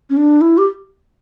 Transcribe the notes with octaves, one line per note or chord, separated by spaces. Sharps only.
C#4
D4
E4
G4